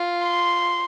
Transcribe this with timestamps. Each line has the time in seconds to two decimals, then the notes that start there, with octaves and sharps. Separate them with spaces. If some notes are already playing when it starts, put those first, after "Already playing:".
Already playing: F4
0.23 C6